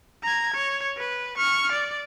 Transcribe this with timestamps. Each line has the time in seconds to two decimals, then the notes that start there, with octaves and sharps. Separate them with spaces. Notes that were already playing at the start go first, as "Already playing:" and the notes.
0.23 A#5 G#6
0.54 C#5
0.97 B4
1.37 C#6 F6
1.72 D5